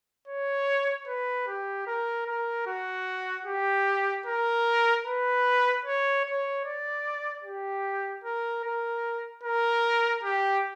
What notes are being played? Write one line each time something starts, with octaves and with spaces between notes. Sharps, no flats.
C#5
B4
G4
A#4
A#4
F#4
G4
A#4
B4
C#5
C#5
D5
G4
A#4
A#4
A#4
G4